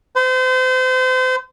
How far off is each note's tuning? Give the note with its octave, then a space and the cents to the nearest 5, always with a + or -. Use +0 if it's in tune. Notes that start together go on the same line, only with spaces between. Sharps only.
C5 -35